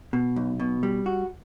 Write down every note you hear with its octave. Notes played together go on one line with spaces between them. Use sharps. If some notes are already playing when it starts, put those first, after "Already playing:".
B2
B1
B2
G3
F#4